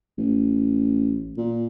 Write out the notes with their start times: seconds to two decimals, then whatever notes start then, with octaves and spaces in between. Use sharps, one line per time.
0.18 A1
1.37 A#2